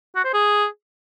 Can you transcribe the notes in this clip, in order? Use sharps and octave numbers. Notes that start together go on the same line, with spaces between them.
F#4
C5
G#4